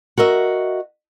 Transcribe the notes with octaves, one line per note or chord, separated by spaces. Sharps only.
F#4 A#4 D#5 E5